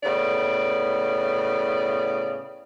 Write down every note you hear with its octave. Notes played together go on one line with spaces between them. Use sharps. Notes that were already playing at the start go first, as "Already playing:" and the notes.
A2 C#3 B3 D5